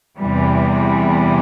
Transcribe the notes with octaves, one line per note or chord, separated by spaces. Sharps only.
E2 C3 E3 G3